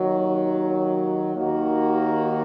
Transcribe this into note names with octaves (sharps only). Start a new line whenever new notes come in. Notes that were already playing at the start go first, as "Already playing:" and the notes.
Already playing: D#2 D#3 F#3
D#2 D#3 A#3 F#4